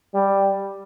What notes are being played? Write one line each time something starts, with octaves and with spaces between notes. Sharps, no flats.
G3